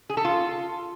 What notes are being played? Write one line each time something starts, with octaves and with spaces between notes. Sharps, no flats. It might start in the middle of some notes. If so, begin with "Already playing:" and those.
G#4
A4
F4